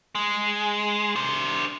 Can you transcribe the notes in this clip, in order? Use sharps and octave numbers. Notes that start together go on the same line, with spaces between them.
G#3
D4 C5